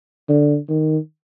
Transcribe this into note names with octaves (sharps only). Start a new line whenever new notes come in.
D3
D#3